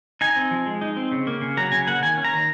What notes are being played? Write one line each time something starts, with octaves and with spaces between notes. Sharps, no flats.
D#4 G#5
C4
F3
G#3
D#4
C4
C#3
A#3
C#3
F#3 A#5
C#3 G#5
A#3 F#5
D#3 G#5
C#4
A#5
D#3